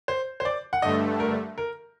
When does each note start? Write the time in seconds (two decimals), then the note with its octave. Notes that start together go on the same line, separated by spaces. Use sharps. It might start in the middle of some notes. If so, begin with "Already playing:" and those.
0.08 C5
0.40 C5
0.45 D5
0.73 F#5
0.82 G2 D3 A3 D#5
1.20 A#4
1.58 A#4